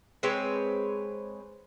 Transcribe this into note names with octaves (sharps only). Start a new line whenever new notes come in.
G#3 C4 B4 C#5